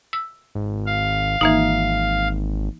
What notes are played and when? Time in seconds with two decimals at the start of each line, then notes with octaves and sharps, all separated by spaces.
0.13 E6
0.55 G#1
0.86 F5
1.41 G#1 E3 A#3 D#4